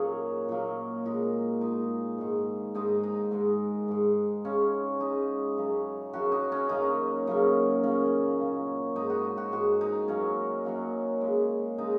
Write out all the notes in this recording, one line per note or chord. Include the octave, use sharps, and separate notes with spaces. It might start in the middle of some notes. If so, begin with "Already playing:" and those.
Already playing: A#2 C#3 F#3 A#3 D#4 F#4 G#4
A#2 F#3 A#3
A#2 G#3 D#4
A#2 G#3 D#4
G#2 D#3 G#3
G#2 D#3 G#3 D#4
D#4
G#2 G#3
G#2 G#3
C#3 G#3 C#4
C#3 G#3 D#4
F#2 C#3 F#3
F#2 C#3 F#3 F#4
D#4
C#4
F#2 C#3 F#3 A#3 D#4
F#2 C#3 F#3 A#3
A#2 A#3 C#4
A#2 A#3
G#2 G#3 D#4
F#4
D#4
F#4
G#2 G#3 F#4
D#4
F#2 F#3 A#3 C#4
F#2 F#3 A#3
C#3 G#3
C#3 G#3 D#4